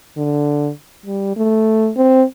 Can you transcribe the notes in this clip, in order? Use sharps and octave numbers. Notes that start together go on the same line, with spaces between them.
D3
G3
A3
C4